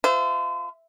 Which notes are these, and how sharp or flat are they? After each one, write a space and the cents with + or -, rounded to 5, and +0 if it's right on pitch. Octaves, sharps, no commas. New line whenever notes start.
F4 +0 C5 -35 E5 +0